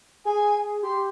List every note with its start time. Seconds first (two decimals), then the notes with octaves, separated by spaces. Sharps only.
0.25 G#4 G#5
0.83 G4 C6